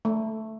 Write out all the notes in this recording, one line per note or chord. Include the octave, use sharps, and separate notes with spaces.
A3